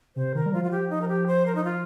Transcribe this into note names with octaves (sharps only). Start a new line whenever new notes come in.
C3 C5
D#3 A#4
G3
F3 F4
F4
F3 G4
D#4
A#4
G4
C5
A#4
D#4
F4